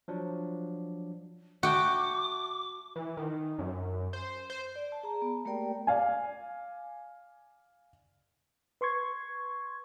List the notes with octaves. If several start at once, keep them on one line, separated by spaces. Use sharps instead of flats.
F3 F#3 D4
F#4 E5 G5 A5 D6
E3
D#3
F#2
C5
C5
D5
A5
G#4 A#5
B3
A3 A#3 G4 A#4 D5 G5
D5 F5 G#5
B4 C6 C#6 G#6